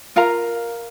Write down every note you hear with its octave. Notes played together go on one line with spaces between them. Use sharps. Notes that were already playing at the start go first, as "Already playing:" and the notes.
F4 A#4 F5 A#5